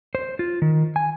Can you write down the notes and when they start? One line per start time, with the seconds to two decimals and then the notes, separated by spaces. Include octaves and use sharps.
0.15 C5
0.39 F4
0.62 D#3
0.96 G#5